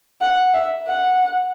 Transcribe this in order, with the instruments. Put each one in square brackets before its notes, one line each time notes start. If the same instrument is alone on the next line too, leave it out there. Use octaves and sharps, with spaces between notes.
[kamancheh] F#5
E5
F#5